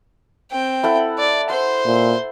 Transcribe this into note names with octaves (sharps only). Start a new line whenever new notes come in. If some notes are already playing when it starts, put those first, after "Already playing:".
C4 G5
E4 A4 F#5
D5
C5 F#5 C6
A#2